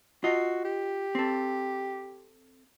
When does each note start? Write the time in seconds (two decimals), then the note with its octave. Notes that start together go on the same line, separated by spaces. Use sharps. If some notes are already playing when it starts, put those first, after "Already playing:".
0.24 F4 F#4 D#5
0.65 G4
1.15 C4 A4